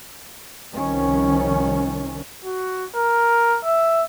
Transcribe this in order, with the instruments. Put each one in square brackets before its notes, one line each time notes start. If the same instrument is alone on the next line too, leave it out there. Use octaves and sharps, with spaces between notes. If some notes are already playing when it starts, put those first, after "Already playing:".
[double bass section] C2 D#3 F3 C#4
[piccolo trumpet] F#4
A#4
E5